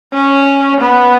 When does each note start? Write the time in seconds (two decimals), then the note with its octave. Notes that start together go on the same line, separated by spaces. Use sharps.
0.13 C#4
0.80 B3